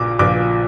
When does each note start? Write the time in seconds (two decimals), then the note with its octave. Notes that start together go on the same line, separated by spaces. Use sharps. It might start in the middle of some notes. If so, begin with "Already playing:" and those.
Already playing: A#1 A#2 F3 D6
0.19 A#1 A#2 F3 D6